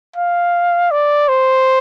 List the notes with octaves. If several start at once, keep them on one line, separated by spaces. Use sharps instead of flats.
F5
D5
C5